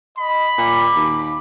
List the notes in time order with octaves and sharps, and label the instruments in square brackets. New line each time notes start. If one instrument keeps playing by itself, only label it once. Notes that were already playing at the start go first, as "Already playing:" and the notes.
[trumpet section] D#5 [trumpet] B5
[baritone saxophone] A#2 [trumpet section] D6
[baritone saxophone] D#2